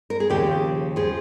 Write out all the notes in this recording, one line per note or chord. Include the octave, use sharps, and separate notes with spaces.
A#4
G#4
D#2 C#3 F3 G4
F3 G#4